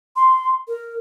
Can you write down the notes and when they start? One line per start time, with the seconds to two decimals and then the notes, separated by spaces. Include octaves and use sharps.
0.16 C6
0.68 A#4